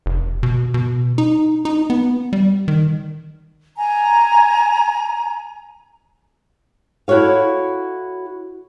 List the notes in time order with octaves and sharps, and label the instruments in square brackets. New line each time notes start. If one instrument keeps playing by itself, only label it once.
[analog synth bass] F1
B2
B2
D#4
D#4
B3
G3
D#3
[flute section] G#5 A#5
[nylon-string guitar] E4 F#4 A4 C#5 F5